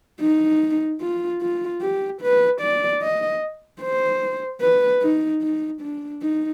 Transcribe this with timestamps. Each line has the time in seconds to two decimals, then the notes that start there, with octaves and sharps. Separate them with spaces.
0.21 D#4
1.01 F4
1.41 F4
1.82 G4
2.21 B4
2.61 D5
3.02 D#5
3.82 C5
4.61 B4
5.02 D#4
5.42 D#4
5.82 D4
6.22 D#4